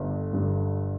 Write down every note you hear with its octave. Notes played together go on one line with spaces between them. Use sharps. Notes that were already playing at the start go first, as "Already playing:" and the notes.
Already playing: G1 G2 D3
G2 D3